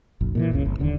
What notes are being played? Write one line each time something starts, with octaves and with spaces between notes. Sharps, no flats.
F#1 B1
A#2 D#3 E3
F#1 C#2 C#3
G1
D#1 D#2 D3